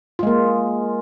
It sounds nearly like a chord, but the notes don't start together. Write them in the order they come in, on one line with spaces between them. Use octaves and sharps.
F4 G#3 A#3